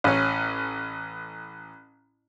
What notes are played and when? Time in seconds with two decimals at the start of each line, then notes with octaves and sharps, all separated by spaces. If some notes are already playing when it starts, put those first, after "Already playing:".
0.04 A1 C#4